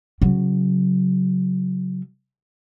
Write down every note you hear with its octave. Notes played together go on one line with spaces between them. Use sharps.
C#3 F#3